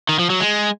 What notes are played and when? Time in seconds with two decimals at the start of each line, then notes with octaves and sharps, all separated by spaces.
0.09 D#3
0.19 F3
0.30 F#3
0.40 G#3